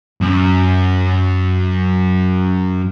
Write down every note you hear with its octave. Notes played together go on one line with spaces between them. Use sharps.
F#2 C#4